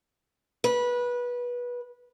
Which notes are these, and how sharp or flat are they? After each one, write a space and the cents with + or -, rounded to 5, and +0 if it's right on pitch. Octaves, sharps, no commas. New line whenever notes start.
B4 -20